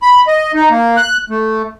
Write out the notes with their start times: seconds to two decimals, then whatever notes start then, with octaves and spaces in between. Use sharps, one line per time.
0.02 B5
0.27 D#5
0.54 D#4
0.70 A#3
0.97 F#6
1.30 A3